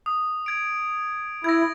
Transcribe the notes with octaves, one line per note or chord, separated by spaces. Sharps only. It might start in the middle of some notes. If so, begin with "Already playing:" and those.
D#6
G#6 D7
E4 G#6 A#6